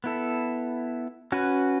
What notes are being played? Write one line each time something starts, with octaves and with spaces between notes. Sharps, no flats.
B3 E4 A4
C#4 F#4 B4